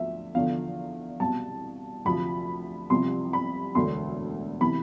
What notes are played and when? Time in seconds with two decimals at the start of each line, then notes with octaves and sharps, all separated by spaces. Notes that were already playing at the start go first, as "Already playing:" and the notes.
Already playing: D2 F3 E5
0.35 E2 D3 F3 F5
1.20 C2 B2 A5
2.05 D2 C3 F3 B5
2.90 C2 C3 F3 C6
3.33 B5
3.75 E1 D2 D3 C6
4.61 C3 E3 B5